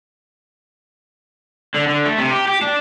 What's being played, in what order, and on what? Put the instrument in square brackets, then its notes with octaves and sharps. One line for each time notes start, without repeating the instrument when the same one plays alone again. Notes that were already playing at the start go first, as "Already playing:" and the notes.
[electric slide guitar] D3
D3
A3
C3
G4
G4
D4